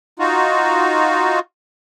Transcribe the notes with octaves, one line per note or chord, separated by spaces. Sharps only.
D#4 F4 F#4